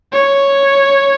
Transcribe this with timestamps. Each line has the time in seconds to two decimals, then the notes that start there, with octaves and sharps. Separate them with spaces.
0.13 C#5